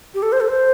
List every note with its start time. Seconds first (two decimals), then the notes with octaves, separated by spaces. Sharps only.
0.14 G4
0.22 A4
0.32 C5
0.40 A4
0.49 C5